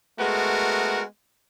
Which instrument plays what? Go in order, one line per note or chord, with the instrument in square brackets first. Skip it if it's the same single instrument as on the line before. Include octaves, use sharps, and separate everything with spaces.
[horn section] G#3 A3 B3 F#4 A#4